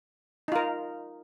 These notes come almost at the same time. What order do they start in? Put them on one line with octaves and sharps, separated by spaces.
D#4 F4 A#4